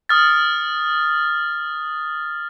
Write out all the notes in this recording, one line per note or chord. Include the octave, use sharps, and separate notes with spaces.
D#6 F6 A6